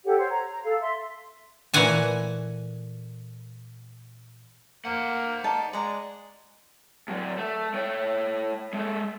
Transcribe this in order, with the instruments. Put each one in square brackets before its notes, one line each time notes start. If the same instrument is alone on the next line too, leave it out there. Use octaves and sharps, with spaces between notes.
[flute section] G4 A4 C#5 F#5
C5 C#5
A#5
A#5
A4 F5
E5 C6
[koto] A#2 E3 A3 F#5 G#5 A5
[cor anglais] A#3 [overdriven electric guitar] C5 F#5
[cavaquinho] D#4 D5 A5
[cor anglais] G#3 [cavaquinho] D5 F#5 A#5
[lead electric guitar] A2 F#3
A3
A3 C#5
G#3 A3